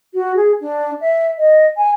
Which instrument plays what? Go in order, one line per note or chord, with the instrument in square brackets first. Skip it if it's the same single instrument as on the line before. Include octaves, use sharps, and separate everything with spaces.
[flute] F#4
G#4
D4
E5
D#5
G#5